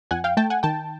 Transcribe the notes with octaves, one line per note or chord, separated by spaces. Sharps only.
F2 F#5 G#5
F5 G5
A3 G5 A5
F#5 G#5
D#3 G5 A5